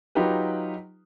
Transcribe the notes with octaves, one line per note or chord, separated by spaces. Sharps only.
F#3 D#4 F4 G4 B4